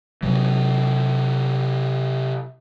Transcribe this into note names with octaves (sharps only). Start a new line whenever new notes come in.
C3 F#3